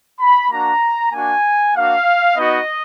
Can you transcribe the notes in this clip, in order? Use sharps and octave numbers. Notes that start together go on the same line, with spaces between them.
B5
A#3 D4 F#4 A#5
A#3 D4 F#4 G#5
A#3 D4 F#4 F5
B3 D#4 F#4 D#5